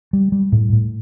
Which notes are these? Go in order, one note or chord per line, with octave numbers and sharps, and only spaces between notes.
G3
G3
A2
A2